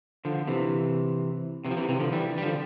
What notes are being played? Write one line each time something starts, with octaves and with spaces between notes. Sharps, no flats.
D3 F3
C3 E3
C3 E3
F3
C3 E3
C3 E3
D3 F3
E3 G3
G3
D3 F3